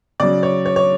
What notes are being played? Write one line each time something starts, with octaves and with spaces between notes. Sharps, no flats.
C#3 F#3 D5
C#5
C#5
C#5